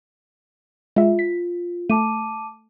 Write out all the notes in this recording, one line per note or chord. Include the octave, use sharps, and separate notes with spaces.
G#3 F4 E5
B6
A3 A5 D6 D#7